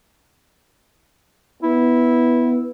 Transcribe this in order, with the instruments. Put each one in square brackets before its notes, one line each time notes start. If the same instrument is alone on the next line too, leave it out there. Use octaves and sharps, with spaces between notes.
[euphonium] B3 [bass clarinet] E4